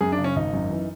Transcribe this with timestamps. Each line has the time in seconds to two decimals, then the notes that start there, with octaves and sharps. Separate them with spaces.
0.01 F#2 G#4
0.12 D4
0.18 C#3
0.24 C#4
0.36 G#1 D#4
0.53 F#2
0.71 E3